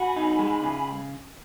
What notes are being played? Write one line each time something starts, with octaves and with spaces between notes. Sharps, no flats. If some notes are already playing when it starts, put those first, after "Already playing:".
Already playing: F#4 G#5 B5
D#4
G#3
C#3